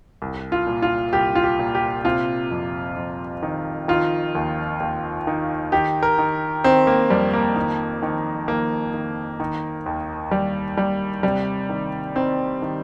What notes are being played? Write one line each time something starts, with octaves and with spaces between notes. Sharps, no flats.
C2
F4
A#2
F4
C2 G4
F4
G4
A#2
G4
C3 F4
F2
F2
D#3
D#3 F4
D#2
D#2
D#3
D#3 G4
A#4
D#3
D#3 C4
A#3
F2 G3
A#3
D#3
D#3
D#3 A#3
D#3
D#3
D#2
D#2 G3
D#2 G3
C3 G3
D#3
D#3 C4
D#3